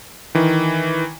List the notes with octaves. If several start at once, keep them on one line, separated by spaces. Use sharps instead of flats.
D#3 E3